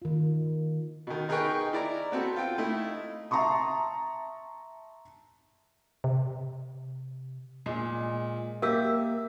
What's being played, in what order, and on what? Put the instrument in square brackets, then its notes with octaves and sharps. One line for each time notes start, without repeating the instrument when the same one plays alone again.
[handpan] D#3 F4
[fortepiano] B2 D#3
D#4 G#4 A#4 B4 G5 C#6
E4 D5 A#5
B3 C4 F#4 A4
F4 G5
A3 D#4 E4
[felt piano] E5 A5 A#5 C6 C#6 D#6
[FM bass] C3
[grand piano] A#2 [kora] G#3
[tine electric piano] A#3 [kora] G4 [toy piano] A#4 E6 [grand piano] E5